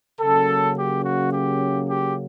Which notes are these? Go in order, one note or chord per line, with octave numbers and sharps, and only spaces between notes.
C#3 F#3 A#3 C#4 A4
G4
F#4
G4
G4